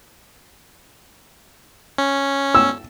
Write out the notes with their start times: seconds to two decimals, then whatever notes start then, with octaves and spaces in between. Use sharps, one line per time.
1.98 C#4
2.55 E6